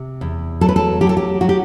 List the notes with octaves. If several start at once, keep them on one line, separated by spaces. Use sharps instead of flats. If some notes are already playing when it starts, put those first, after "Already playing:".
Already playing: C3
E2
F#3 A4
B4
A4
F#3 G4
A4
G4
F#3 F#4
G4